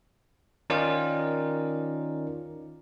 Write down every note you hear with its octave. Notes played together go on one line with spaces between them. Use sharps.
D#3 C#4 D#4 F4 A#4 D5